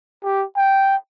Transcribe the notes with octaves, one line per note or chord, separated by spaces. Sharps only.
G4
G5